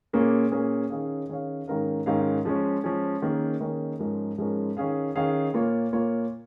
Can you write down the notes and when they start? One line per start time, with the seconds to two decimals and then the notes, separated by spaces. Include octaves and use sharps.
0.13 A#2 A#3 C#4 G#4
0.52 A#2 A#3 C#4 G#4
0.90 D#3 C#4 G#4 C#5 F5
1.29 D#3 C#4 G#4 C#5 F5
1.68 G#2 D#3 C#4 A#4 F5
2.06 G#2 D#3 C#4 A#4 F5
2.45 F3 G#3 C#4
2.84 F3 G#3 C#4
3.22 D#3 A#3 C#4 G#4
3.60 D#3 A#3 C#4 G#4
3.99 G#2 F3 G#3 C#4 A#4
4.38 G#2 F3 G#3 C#4 A#4
4.77 D#3 C#4 G#4 F5
5.15 D#3 C#4 G#4 F5
5.54 A#2 A#3 F4 C#5
5.93 A#2 A#3 F4 C#5